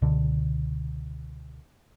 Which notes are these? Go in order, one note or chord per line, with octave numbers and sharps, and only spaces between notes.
C#2 B2 D3